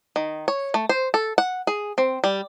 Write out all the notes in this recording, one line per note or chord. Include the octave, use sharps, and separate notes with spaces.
D#3
C#5
A3
C5
A4
F#5
G#4
C4
G3